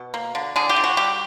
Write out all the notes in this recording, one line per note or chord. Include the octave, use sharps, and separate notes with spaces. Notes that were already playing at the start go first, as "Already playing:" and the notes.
Already playing: B2
A#3
D3
D3 G#4
G4
D3
F#4
G3 G4